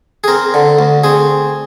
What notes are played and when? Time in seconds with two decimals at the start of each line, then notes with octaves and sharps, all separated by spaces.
0.24 G#4
0.28 C4 A#4
0.54 D3
0.79 D2
1.04 C4 G#4